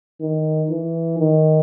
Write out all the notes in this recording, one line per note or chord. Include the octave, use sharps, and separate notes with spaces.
D#3
E3
D#3